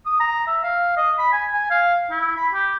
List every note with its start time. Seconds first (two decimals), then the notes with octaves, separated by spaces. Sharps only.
0.06 D#6
0.20 A#5
0.47 E5
0.63 F5
0.97 D#5
1.18 B5
1.32 G#5
1.53 G#5
1.70 F5
2.11 E4
2.36 B5
2.53 G4